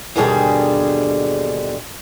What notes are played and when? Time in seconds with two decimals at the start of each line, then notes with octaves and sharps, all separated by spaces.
0.16 D#2 G#2 B2 D3 G3 G#4